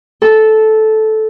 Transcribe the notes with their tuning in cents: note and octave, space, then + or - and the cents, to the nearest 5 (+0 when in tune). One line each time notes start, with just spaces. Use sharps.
A4 -10